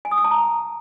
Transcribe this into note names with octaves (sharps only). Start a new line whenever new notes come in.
G#5
D#6
E6
A5
A#5